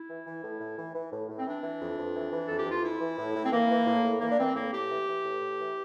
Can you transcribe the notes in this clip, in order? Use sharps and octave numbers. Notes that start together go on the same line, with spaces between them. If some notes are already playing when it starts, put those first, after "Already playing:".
Already playing: E4
E3
E3
A2
A2
E3
E3
A2
A2
C4
E3 D4
E3
F2
F2
E3
E3
F2 A4
G4
F2
F4
E3 E4
E3
A2
A2
C4
E3 A#3
E3
A2
A2
E3 A#3
D4
E3 C4
A2 A#3
A2 G4
E3
E3
A2
A2
E3